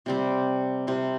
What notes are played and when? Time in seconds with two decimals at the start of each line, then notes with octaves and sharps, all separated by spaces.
0.06 C3 G3 C4
0.87 C3 G3 C4